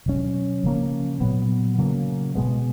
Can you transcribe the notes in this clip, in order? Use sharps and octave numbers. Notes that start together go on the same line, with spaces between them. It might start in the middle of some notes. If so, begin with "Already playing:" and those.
B2 F#3 C#4
C#3 F3 A#3 C#4
A#2 F#3 B3
C#3 F#3 A#3
B2 G#3 B3